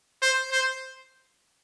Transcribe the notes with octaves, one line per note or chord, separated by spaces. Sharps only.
C5
C5